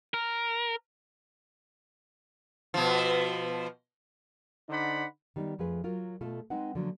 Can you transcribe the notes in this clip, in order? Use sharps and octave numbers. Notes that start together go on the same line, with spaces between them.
A#4
B2 F3
D3 D#4 C5 D5 F#5 B5
D#3 G3 B3 D#4
F2 F3 A3 G#4 B4
F#3 F4 A#4
B2 A3 F4 A4
G#3 C4 D#4 B4 F#5
D3 F3 F#3 A#3